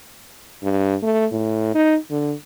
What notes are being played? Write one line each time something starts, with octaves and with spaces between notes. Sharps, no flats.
G2
A3
A2
D#4
D3